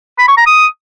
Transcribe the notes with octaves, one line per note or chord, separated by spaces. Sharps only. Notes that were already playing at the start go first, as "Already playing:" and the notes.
B5
C#6
A#5
D#6